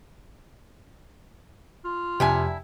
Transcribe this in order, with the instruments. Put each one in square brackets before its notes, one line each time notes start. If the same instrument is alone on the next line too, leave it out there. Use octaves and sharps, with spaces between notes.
[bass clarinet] F4
[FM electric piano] F2 G5 [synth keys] C3 [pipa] D4 E4 G#5